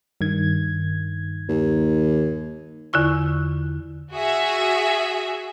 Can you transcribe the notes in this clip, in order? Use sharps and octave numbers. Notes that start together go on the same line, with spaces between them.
G2 D#3 G#6
D#2
E2 D3 E4 F4 C#6
F#4 G#4 E5